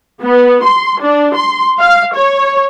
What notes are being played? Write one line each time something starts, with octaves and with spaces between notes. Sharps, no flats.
B3
C6
D4
C6
F5
C#5